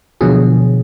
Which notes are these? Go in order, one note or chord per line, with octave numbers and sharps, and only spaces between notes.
B2 D3 F3 F#3 G#4